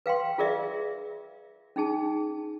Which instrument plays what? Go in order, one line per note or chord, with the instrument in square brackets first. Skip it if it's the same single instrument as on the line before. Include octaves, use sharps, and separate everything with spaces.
[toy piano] B4 F5 G5 C6
F4 G#4 A#4 D5 E5
C#4 D#4 G#4 A5